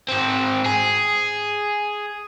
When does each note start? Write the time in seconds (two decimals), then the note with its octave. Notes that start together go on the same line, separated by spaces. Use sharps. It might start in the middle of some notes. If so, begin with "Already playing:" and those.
0.09 G#2 C4
0.66 G#4